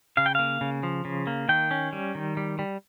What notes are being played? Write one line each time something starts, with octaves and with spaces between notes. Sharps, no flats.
C#3 F5
G5
A#3 F5
C#3
F3
C#3
A#3
D#3 G5
C#4
G3
D#3
G3
G3